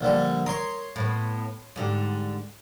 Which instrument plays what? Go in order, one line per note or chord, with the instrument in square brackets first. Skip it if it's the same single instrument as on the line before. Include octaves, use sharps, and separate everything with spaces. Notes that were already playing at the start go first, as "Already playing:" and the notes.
[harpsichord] A#1 D3 G3
[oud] A#4 [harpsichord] C#5 C6 D#6
[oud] A2 B3
G#2 D3 G3